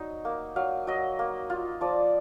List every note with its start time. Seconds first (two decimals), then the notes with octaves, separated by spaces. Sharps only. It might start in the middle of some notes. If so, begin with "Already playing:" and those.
Already playing: F#3 D#4
0.25 A#3
0.56 F#3 F5
0.87 F#3 D#5
1.19 A#3
1.50 F4
1.81 F3 D5